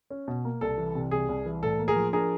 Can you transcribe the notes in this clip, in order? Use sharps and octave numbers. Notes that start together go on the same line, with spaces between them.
C#4
B2
A#3
C2 A4
E3
C3
C2 G#4
C2
E3
A2 A4
A#3
G#4 A#4
F3
D4 G#4 A#4